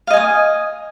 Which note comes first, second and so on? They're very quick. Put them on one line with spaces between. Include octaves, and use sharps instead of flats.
F5 D#5 G#5 D#6